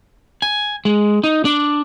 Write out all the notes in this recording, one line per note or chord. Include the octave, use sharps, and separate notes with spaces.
G#5
G#3
D#4
D4